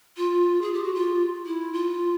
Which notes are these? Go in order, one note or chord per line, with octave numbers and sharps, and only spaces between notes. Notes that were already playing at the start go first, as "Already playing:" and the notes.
F4
G#4
G4
F#4
F4
E4
F4